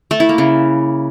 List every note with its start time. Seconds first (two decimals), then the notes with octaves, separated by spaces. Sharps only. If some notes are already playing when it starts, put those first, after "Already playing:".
0.11 A3
0.20 E4
0.29 A#3
0.38 C#3